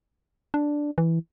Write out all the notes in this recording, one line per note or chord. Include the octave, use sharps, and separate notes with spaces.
D4
E3